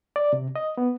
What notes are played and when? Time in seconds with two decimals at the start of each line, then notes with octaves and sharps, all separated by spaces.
0.16 D5
0.33 C3
0.56 D#5
0.77 B3